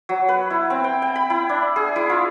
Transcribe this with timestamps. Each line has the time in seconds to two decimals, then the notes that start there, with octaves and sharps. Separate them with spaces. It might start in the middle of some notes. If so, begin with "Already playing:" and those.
0.09 F#3
0.29 B4
0.50 E4
0.70 C4
0.84 G5
1.02 G5
1.16 B5
1.30 E4
1.49 D4
1.76 G#4
1.96 E4
2.10 F4